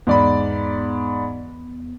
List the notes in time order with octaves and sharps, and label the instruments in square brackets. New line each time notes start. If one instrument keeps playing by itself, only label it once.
[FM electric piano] E2 B3 [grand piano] G#2 D5 B5